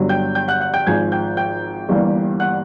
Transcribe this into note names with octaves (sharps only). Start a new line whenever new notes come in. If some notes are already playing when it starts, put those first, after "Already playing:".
Already playing: G1 G2 D3 F#3
G5 G6
G5 G6
F#5 F#6
F#5 F#6
G5 G6
G#1 G#2 F3 G#3 G#5 G#6
G5 G6
G5 G6
G1 G2 E3 G3 A#3
F#5 F#6